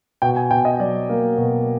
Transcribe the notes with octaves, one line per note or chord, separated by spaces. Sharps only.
B2 G5
G#5
B2 G5
D#5
F#3 D5
A#3
B2